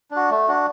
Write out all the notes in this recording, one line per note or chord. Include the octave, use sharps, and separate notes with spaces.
D4
F#4
A3
D4 F#4